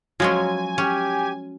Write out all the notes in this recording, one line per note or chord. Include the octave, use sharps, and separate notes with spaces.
F3 F#3 G#3 C#4 G#5
C#4 G4